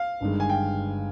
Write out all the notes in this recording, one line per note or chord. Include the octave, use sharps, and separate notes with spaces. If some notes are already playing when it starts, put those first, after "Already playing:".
Already playing: F5
G1 G2 D#3 G#3
G#5
G5